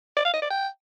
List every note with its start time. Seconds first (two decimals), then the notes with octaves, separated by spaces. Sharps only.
0.16 D5
0.25 F5
0.33 D#5
0.42 D5
0.50 G5